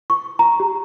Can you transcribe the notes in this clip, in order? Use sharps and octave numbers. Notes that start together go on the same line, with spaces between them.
C#6
A#5
G4